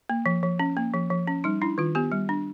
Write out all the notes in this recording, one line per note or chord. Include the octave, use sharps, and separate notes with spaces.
A#3
F3
F3
C#4
A#3
F3
F3
C#4
G3 D#4
D4 E4
D#3 F4
B3 G4
G3
D4